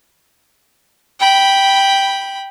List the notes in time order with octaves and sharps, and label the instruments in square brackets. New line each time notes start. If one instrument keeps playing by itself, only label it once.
[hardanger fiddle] G5 B5